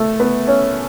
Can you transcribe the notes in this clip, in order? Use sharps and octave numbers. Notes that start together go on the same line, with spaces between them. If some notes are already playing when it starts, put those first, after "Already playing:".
Already playing: A3 A4
B3 B4
C#4 C#5